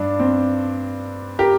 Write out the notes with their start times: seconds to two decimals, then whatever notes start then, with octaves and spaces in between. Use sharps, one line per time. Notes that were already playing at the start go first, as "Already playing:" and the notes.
Already playing: G2 D4
0.19 C4
1.39 G4 A#4